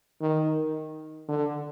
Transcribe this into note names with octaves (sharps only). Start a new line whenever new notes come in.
D#3
D3